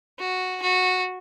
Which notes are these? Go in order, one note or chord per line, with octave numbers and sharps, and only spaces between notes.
F#4
F#4